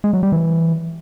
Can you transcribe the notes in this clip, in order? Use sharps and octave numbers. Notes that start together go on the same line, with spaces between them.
G#3
F#3
G3
E3